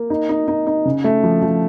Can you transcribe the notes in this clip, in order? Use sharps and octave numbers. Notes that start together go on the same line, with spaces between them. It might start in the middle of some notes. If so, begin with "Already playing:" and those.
Already playing: A#3
D#4
D#4
D#4
D#4
C#3
A3
F3
F3